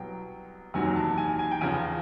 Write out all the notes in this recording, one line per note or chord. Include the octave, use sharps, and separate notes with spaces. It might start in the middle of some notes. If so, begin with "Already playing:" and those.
Already playing: C2 B2 F#3 G5
F#1 E2 C3 D#3 F#3 G#5
A5
G#5
G#5
G5
E2 C#3 F3 G#5